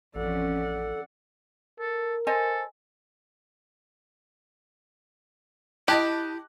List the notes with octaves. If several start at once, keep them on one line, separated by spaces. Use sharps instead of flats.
A1 F2 C#4 A4 D5 F#5
A4 A#4
A4 C5 D#5 G#5
E4 G4 D#5 A5 F#6